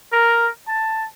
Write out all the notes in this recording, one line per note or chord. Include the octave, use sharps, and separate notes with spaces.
A#4
A5